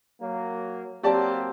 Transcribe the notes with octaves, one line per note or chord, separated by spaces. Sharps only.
F#3 A#3
F#3 A#3 C4 G4 D5 A5